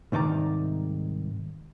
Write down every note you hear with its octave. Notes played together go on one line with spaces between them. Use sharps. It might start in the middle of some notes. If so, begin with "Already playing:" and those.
C2 G#2 D#3 D5 A#5